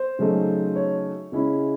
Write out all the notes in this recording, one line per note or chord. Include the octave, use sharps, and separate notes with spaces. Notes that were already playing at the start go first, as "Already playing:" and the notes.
Already playing: C5
C#3 F#3 A3 D#4
C#5
C#3 G#3 C#4 E4